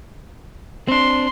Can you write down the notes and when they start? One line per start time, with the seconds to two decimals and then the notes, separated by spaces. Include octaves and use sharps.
0.88 C4 D4 C6